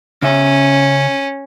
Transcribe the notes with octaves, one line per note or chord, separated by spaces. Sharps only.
C#3 C#4 E5